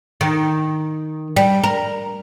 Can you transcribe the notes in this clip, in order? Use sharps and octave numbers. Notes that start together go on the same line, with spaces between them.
D#3
G3
A#4